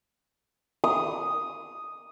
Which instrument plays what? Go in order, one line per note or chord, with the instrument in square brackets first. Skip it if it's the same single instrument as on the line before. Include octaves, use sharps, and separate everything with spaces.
[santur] D#6